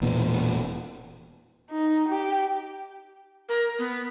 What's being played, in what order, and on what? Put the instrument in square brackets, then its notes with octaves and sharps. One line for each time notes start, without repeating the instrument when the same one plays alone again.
[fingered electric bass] E1 A#2 E3 B3
[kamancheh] D#4
G4
[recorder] A#4
B3